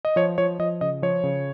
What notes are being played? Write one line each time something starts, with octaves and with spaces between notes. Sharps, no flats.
D#5
F3 C#5
F3 C#5
F3 D#5
C#3 D#5
F3 C#5
C#3